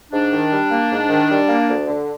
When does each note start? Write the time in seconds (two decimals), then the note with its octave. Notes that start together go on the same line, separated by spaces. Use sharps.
0.12 G#2 D4
0.32 D#3
0.51 G3
0.71 A#3
0.90 G#2
1.10 D#3
1.29 G3
1.49 A#3
1.68 D2
1.88 D3